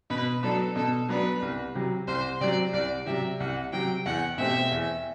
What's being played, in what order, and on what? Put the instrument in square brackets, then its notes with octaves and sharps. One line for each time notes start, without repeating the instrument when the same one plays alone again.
[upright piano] B2 [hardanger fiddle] B4
[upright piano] F#3 B3 D4 [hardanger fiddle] A4
[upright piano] B2 [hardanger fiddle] A4
[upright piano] F#3 B3 D4 [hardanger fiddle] B4
[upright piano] C2
C3 F#3
[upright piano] C2 [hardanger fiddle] C5
[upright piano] C3 F#3 [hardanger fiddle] D5
[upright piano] C2 [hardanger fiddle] D5
[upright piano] C3 F#3 [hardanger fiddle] E5
[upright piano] C2 [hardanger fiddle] F#5
[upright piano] C3 F#3 [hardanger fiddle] G5
[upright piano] E2 [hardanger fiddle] F#5
[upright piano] B2 A3 C4 G4 [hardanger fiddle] E5
[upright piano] E2